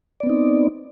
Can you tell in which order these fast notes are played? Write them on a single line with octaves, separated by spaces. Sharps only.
D5 B3 C4 D#4